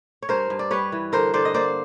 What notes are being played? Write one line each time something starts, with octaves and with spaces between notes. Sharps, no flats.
C#5
G2 A#4 C5
G2
D5
G3 B4 C#5
E3
D3 A#4 C5
D3 C5 D5
D#5
A#3 C5 D5